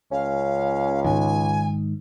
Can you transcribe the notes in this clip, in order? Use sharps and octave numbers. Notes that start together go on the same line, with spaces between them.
C#2 C#4 F5
G#2 D#3 G#5